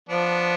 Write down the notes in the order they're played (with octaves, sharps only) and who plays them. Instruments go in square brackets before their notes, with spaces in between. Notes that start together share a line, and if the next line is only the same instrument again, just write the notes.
[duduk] F3 [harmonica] B3 D4